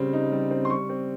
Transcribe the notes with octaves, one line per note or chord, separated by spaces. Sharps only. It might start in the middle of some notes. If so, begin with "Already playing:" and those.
Already playing: C#3 G3 C4
D#4
G3
C4
C6
G3 C#6
C4